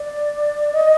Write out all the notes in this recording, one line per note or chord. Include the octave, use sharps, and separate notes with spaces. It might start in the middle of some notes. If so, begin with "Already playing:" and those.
Already playing: D5
D#5